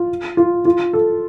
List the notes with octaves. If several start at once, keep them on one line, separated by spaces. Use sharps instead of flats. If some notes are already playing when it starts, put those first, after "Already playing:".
Already playing: F4
F4
F4
A4